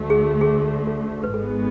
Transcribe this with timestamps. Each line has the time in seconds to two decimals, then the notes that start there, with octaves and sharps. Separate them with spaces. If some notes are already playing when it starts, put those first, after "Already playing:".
Already playing: D2 D3 A3
0.10 G#4
0.41 G#4
0.87 A4
1.23 B4
1.34 G#1 G#2 G#3 B3 A4